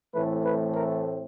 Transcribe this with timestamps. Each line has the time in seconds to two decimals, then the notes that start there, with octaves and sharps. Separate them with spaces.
0.15 A2 E3 A3 C4 B4
0.45 B4
0.75 A#4